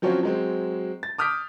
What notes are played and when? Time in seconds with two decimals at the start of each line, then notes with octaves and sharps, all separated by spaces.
0.02 F3 F#3 C4 C#4 F4 F#4
0.23 F#3 G#3 C4
1.03 A6
1.18 D6 D#6 F6 G6 B6 D7